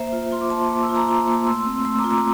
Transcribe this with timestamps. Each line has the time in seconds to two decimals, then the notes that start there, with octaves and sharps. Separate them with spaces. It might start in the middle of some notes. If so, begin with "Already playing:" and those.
Already playing: A#3 C5 E5
0.13 F4
0.32 F4 C6
0.41 D6
0.50 A#3 A5 C6
0.70 A#3 D6
0.83 E6
0.89 F4
0.94 A#5 D6
1.08 F4 A#5 D6
1.28 A#3
1.47 A3 C6 E6
1.66 C4
1.85 A3 C6 E6
1.98 A#5 D6
2.04 F4
2.11 A#5 D6